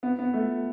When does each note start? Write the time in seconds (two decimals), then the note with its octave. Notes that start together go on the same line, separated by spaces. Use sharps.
0.03 B3
0.19 B3
0.34 A3